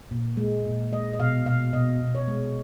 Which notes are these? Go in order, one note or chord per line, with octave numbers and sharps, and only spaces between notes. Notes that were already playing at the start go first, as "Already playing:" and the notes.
A#2
G#3
A#2
G#3 D#5
D#5
B2 F5
B2 F5
B2 D#5
B2
C#5
G#3